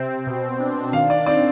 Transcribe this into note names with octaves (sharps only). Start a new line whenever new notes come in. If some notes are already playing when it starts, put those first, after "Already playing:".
Already playing: C3 C4
B2
D4
D#3 F5
D5
C4 D5